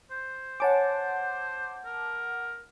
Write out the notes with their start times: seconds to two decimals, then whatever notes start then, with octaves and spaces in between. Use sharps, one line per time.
0.11 C5
0.60 C#5 F#5 G#5 A5 D6
1.85 A#4